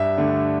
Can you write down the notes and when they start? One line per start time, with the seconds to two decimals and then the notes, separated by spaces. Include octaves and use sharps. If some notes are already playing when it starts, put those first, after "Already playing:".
Already playing: G2 E5
0.17 D3 A3